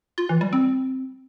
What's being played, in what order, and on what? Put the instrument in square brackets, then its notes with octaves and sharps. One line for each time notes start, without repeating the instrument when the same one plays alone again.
[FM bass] F4
E3
G3
C4